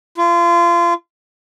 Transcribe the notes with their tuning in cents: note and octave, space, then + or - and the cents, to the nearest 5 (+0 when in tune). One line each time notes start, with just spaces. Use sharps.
F4 -30